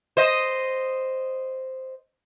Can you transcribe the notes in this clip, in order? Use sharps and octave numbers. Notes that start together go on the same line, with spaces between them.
C5 D#5